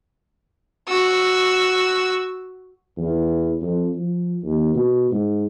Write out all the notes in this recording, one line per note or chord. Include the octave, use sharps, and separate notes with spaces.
F#4 E6
E2
F2
F3
D#2
B2
G#2